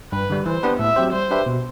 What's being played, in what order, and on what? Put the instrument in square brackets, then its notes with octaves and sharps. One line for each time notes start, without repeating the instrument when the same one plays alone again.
[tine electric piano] G2 [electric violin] B4
[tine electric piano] D3 G3
[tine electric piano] E3 [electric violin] C5
[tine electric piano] B3 D4 G4 B4
[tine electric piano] A2 [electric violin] E5
[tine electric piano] F#3 C4 G4 C5
[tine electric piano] G3 [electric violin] C5
[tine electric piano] D4 G4 B4 E5
B2